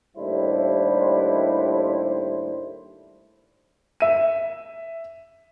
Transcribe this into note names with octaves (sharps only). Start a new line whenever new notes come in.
D#2 A2 G3 D4 E4 C5
E5 D#7